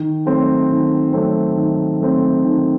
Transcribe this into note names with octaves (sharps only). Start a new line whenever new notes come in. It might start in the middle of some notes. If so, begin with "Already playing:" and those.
Already playing: D#3
F#3 A3 C4
D#3
F#3 A3 C4
D#3
F#3 A3 C4
D#3